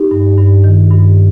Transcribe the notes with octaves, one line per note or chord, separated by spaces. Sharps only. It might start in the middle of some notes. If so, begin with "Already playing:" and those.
Already playing: D#4 G4
G2
G2
D#3
G2